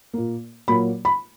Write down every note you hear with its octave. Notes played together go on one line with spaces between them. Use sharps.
A#2 A#3
A#2 F#3 A#3 B5
B5